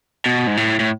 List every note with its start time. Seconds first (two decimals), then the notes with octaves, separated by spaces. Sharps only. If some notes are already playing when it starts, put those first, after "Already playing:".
0.26 B2
0.47 G#2
0.57 A2
0.80 A2